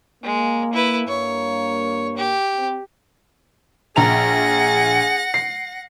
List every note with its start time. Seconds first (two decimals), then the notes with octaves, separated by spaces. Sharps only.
0.24 G#3 A#3
0.73 E4 B4
1.08 G2 A#3 C#5
2.17 G4
2.55 C4
3.96 A#1 G#4 F#5 A#5 A#6 F7
5.34 C7